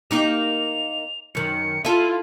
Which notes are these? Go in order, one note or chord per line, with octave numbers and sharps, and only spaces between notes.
A#3 D#4 G4 F7
F#2 D#3 C#7
E4 F4 A4 D#7